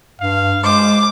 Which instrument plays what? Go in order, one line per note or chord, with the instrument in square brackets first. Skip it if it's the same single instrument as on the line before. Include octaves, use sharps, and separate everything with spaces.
[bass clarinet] G2 [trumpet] F5
[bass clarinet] G#3 [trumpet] C5 [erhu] D6